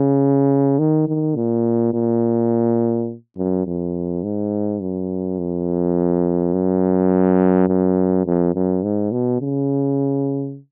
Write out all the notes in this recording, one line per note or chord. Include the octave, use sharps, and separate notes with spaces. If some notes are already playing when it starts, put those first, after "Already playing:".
Already playing: C#3
D#3
D#3
A#2
A#2
F#2
F2
G#2
F#2
F2
F#2
F#2
F2
F#2
G#2
B2
C#3